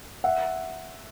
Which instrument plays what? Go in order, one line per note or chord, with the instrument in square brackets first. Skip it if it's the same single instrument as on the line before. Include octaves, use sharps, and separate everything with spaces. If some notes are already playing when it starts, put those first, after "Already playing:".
[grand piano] E5 F#5